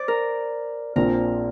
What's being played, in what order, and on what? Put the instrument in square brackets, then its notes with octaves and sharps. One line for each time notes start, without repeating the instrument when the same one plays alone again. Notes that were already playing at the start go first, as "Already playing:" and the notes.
Already playing: [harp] C5 D5
A#4
[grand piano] A#1 A#2 F3 C4 [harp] A#4